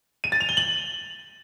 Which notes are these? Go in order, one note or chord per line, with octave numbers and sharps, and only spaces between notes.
D#7
A6
F7
G7
F#7